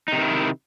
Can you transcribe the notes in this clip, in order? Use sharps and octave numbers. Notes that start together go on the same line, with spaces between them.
C3 D#3 D#4 E4